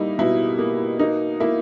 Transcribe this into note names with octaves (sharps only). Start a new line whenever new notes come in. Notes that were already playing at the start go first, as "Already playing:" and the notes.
Already playing: G3 A#3 D#4 E4
B2 E4
A#3
A#3 D#4
A#3 E4